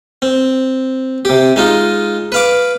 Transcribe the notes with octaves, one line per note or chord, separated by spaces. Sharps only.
C4
C3 G4
G#3 D#4 F4
B4 F5 D6